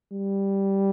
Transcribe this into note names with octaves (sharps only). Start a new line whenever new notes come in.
G3